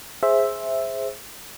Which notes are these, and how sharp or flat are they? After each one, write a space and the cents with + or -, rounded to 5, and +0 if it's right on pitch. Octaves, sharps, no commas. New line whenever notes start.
G#4 +0 C5 +10 E5 +0